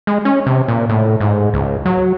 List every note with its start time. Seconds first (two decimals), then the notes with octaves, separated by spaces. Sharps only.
0.07 G#3
0.25 C#4
0.46 C3
0.68 A#2
0.89 A2
1.20 G#2
1.54 C#2
1.85 F#3